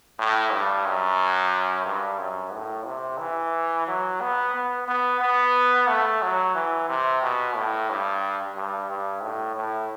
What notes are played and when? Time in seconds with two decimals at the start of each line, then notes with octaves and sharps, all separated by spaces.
0.19 A2
0.52 G2
0.86 F#2
1.85 G2
2.19 F#2
2.53 A2
2.86 C3
3.19 E3
3.87 F#3
4.21 B3
4.54 B3
4.88 B3
5.21 B3
5.89 A3
6.22 F#3
6.55 E3
6.89 C3
7.22 B2
7.56 A2
7.90 G2
8.56 G2
8.90 G2
9.23 A2
9.56 A2